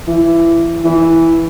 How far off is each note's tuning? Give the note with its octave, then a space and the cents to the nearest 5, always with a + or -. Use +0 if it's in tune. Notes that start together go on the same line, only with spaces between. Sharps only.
E3 +20
E3 +0